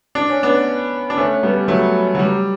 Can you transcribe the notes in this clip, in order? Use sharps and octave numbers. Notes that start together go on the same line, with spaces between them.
D4
C#4
B3 D4
D4
A3 C#4
G3 B3
F#3 A3
F#3
G3